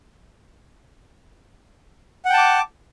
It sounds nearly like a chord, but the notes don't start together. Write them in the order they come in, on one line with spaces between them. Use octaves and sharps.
F#5 G5 A5 D6